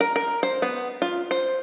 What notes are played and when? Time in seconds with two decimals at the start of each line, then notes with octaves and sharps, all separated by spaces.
0.01 A#4
0.16 A#4
0.43 C5
0.62 B3
1.02 F4
1.31 C5